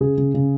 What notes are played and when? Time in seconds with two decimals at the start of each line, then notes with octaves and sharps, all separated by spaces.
0.01 C#3 G#4
0.18 C#3
0.34 C#3